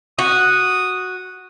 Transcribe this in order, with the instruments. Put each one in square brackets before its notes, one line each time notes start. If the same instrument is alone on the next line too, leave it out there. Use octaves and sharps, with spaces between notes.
[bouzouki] F#4 [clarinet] D#6